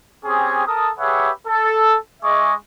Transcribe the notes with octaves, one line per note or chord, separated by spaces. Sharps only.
C4 C#4 G4 G#4
A4 A#4 A5 D#6
G4 G#4 B4 C#5 E5 F#5
A4
G#3 G#4 D#5 E5 C#6 D6